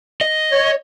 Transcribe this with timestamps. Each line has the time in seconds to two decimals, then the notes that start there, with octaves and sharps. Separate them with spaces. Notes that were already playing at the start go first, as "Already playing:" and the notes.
0.21 D#5
0.52 C#5